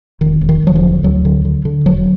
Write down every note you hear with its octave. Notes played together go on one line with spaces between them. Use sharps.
E1 D#3
E1
D#3
E1 F#3
F3
D3
D2 F#3
D3
D3
D3
E1 F#3